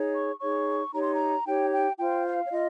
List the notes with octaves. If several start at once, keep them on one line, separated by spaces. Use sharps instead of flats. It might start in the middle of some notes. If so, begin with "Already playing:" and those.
Already playing: D#4 G#4 C#5
C#6
D#4 G#4 C#5 C#6
D#4 G4 C#5 A#5
C6
A#5
D#4 G4 C#5 G5
G5
F4 C5 G5
F5
C#5
F4 D#5